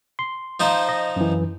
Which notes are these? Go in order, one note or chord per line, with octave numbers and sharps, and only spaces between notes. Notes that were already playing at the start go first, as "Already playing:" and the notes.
C6
F3 D#4 C5
D#5
F#2 E3